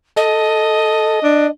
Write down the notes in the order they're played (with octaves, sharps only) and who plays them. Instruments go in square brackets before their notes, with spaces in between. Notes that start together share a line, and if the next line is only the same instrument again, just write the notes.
[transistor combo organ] A4 [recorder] D#5
[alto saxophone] D4